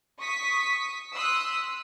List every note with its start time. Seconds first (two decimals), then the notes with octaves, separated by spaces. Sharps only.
0.19 C#6 D#6 B6
1.15 C6 D#6 E6 F#6 B6